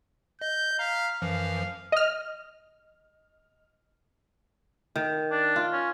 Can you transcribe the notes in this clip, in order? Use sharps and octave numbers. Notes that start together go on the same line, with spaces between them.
D#5 G6
F5 A#5 B6
F#2 E3 F3 F5
D#5 F6
D#3
D4
F4
C#4